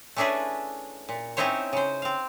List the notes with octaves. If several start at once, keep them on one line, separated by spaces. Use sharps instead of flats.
A3 C#4 D4 E4 G#4 B4
A#2
C4 C#4 D#4 E4 C5 C#5
C#3 C5
C4 F5